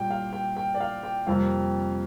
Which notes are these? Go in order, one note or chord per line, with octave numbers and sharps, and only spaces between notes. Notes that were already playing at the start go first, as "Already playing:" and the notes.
Already playing: A#2 G3 A#3 G5
F5
G5
G5
D5
F5
G5
F2 C3 G3 A#3 F5